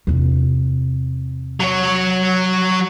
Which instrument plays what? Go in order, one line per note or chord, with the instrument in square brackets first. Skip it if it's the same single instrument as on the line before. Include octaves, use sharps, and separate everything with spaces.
[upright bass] E2 C3
[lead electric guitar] F#3 C#5